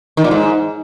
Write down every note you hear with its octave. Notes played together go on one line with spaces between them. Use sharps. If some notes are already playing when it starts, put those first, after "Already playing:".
D#3
A#2
G#2